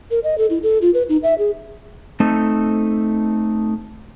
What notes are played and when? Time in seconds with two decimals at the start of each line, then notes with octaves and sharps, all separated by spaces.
0.11 A#4
0.24 D#5
0.38 A4
0.50 E4
0.63 A4
0.82 F4
0.94 B4
1.09 D#4
1.23 E5
1.38 G#4
2.20 A3 C4 D#4 A4